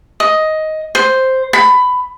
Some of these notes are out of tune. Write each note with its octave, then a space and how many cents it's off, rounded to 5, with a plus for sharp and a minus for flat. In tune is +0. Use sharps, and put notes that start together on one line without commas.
D#5 +10
C5 +0
B5 +15